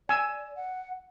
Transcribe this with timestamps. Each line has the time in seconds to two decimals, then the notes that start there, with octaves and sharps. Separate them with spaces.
0.09 D5 G#5 E6
0.56 F#5